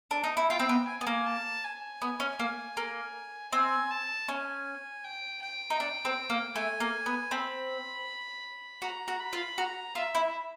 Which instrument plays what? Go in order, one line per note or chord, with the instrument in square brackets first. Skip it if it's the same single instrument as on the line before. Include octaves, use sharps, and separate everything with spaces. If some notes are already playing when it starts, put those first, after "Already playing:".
[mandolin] D4
D#4
E4
[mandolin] F4 [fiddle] G5
[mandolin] C4
B3
[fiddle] G#5
[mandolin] B3
A#3
[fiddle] A5
G#5
[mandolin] B3
C#4
A#3
A#3
[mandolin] C4 [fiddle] G#5
[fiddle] A5
[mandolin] C#4 [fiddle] G#5
[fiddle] G5
G5
[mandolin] D#4
D4
C4
A#3
[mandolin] A3 [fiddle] G#5
[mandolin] A#3
B3
[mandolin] C4 [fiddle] B5
[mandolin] F#4 [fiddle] A#5
[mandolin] F#4
[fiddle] B5
[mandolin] F4
[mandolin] F#4 [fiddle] A#5
[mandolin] F4 [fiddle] E5
[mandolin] E4